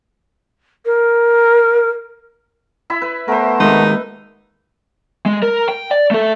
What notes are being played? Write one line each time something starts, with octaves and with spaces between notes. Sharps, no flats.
A#4
E4 E5 B5
B4
A3 B3 A#4 C5
D#2 G#3 A#3 D#4 B4
G#3
A#4
G5
D5
A3 A4